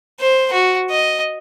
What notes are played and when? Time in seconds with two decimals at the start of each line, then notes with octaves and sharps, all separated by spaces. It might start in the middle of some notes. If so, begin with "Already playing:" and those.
0.20 C5
0.53 F#4
0.91 D#5